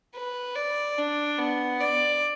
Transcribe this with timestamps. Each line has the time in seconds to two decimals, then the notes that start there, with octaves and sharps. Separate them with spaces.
0.15 B4
0.55 D5
0.98 D4
1.39 B3
1.80 D5